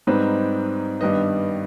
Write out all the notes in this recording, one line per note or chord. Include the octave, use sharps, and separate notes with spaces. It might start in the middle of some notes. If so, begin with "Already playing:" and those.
G#2 G3 C4 D#4 B4
G2 D#3 G3 B3 D#5